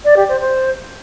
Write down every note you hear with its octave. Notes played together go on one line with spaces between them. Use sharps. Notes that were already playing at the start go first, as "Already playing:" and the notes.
D5
G4
C5
C5